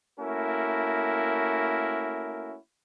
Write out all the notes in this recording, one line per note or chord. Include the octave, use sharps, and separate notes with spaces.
A3 A#3 C#4 E4 F#4 A#4